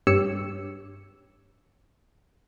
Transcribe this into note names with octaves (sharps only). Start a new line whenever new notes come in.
G2 G4 C#5 E6 C#7 E7